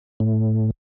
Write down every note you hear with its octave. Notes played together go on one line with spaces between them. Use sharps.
A2